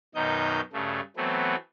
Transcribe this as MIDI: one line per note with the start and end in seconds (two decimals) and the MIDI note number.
0.15 0.61 42
0.15 0.61 47
0.15 0.61 51
0.15 0.61 63
0.15 0.61 75
0.15 0.61 91
0.73 1.00 43
0.73 1.00 49
0.73 1.00 57
1.17 1.55 52
1.17 1.55 54
1.17 1.55 57
1.17 1.55 59
1.17 1.55 60